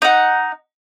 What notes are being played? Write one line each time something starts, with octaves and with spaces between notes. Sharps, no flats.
D#4 F#5